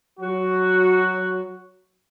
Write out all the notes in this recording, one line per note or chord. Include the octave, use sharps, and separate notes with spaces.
F#3 F#4